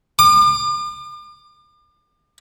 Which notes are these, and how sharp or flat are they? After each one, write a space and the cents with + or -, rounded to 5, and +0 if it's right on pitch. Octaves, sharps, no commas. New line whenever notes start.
D6 +40